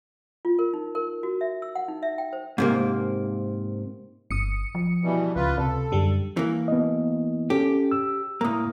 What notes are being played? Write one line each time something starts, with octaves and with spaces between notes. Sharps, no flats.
F4
A#4
D#4
A#4
F#4
E5
E6
F#5
D#4
E5
G5
C5
G#2 C3 A#3
G1 D#6 C#7
F3
B2 E3 G3
C#2 F4 B4
C3 A4
F#2 D3 G3
E3 A#3
B3 D#5
C#4 G4 A4
E6
A2 A#3 A#5 D#6